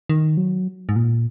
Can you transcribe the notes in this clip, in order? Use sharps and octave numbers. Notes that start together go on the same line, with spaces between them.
D#3
F#3
G#2
A#2